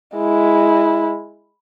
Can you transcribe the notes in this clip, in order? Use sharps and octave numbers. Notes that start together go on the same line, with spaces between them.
G#3 E4